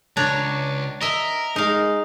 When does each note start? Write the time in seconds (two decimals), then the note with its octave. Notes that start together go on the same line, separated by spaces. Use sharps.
0.17 C#2 D4 C#5 A#5
1.01 A#4 D#5 E5
1.56 G#3 D#4 F5